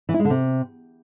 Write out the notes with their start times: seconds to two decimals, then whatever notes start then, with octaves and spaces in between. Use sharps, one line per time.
0.09 E3
0.14 E4
0.19 G#3
0.25 D3
0.30 C3